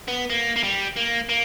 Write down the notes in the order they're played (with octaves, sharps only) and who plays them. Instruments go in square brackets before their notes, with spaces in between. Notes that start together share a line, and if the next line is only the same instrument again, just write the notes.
[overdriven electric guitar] B3
A#3
A#3
G3
A#3
A#3